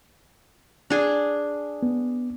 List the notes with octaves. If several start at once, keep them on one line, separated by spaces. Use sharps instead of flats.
D4 G#4
B3